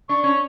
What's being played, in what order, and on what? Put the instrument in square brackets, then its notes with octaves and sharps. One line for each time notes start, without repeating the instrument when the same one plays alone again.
[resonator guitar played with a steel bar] D4 [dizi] C#6
[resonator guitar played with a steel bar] C#4 [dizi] C#6